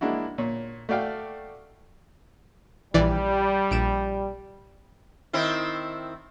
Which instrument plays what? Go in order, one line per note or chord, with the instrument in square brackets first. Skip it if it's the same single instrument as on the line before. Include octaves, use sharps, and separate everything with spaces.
[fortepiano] G#3 A#3 D4 E4 F#4
A#2 C#5
A3 F#4 D5 F5 G5
[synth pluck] A#1 E3 D5 [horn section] G3
[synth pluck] A#1 D7 E7
[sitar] D#3 C4 E4